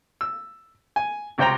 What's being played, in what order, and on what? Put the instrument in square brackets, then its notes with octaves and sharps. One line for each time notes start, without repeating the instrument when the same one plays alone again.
[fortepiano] E6
G#5
C#2 C3 C5 G5 A#5